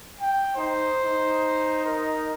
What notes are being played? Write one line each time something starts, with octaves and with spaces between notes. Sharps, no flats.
G5
D#4 C5
D#4
A#4